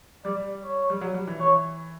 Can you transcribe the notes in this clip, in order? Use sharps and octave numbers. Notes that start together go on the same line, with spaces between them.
G3 D5
C#5
G3
F#3
G3
E3
E3 C#5